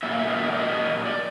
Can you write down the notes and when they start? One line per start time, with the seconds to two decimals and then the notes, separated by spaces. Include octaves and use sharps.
0.03 A#2 F#3 A#3 E5
0.12 F5
0.19 E5
0.28 D#5
0.36 E5
0.44 D#5
0.52 D5
0.59 D#5
1.05 D5